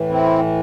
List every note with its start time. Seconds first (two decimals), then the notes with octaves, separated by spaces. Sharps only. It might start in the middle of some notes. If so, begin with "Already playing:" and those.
Already playing: A2 E3
0.09 C4 E4